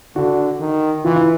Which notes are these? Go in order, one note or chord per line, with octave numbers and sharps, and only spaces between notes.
D3 F#4
D#3
E3 F4
E4